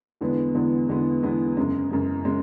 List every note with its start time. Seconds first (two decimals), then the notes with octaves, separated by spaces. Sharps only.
0.21 E2 D3 G#3 B3
0.55 E2 D3 G#3 B3
0.88 E2 D3 G#3 B3
1.23 E2 D3 G#3 B3
1.57 F#2 C#3 G#3
1.91 F#2 C#3 G#3
2.25 C#3 G#3